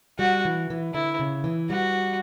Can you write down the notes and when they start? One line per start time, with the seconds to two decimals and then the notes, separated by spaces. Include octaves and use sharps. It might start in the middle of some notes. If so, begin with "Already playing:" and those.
0.19 G3 F#4
0.45 E3
0.70 E3
0.94 D3 E4
1.19 C#3
1.44 E3
1.70 G3 F#4